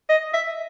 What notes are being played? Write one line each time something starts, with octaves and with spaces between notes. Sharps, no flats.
D#5
E5